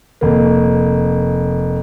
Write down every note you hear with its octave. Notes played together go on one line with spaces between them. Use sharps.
F1 A#3